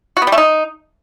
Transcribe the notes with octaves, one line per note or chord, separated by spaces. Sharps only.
F#4
B3
G3
A3
D#4